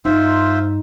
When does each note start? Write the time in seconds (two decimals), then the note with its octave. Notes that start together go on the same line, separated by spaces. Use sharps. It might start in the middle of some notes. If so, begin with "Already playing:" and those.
0.05 G2 D#4 F4 C5 E5